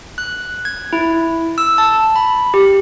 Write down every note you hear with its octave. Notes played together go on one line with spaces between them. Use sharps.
F#6
G#6
E4
E6
A5
B5
G4